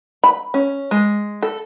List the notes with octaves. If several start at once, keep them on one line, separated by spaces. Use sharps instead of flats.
B5
C#4
G#3
A4